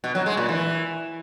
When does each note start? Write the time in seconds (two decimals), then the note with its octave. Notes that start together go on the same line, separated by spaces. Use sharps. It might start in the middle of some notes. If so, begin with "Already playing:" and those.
0.04 B2
0.15 F#3
0.26 G#3
0.37 A#2
0.49 E3